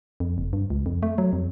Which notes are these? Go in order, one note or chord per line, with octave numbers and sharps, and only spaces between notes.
F2
F#1
G2
C#2
F2
A3
F#3
F2